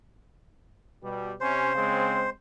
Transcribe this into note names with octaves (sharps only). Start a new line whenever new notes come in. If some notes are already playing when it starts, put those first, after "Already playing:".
B2 G3
C3 C#4 C5
C#3 G#3 C4